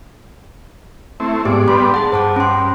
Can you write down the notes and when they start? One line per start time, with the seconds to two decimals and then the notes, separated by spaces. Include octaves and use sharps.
1.20 A3 C4 E4
1.45 G#2 B3 G4 D5
1.68 G3 B3 D4 C6
1.94 G#4 F#5 A5
2.12 G2 C5 A5 D6
2.36 C#4 C6